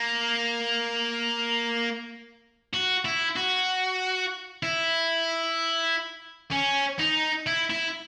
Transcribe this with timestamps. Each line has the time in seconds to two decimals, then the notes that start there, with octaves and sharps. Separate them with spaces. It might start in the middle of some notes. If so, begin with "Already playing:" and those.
Already playing: A#3
2.73 F#4
3.05 E4
3.36 F#4
4.63 E4
6.52 C#4
6.99 D#4
7.46 E4
7.70 E4